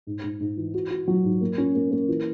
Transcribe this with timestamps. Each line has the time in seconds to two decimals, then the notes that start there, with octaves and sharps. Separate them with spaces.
0.07 G#2
0.24 G#2
0.40 G#2
0.57 E3
0.74 F#4
0.91 F#4
1.08 F#3
1.24 G#2
1.41 A#3
1.58 C#4
1.75 A#3
1.91 A#3
2.08 E3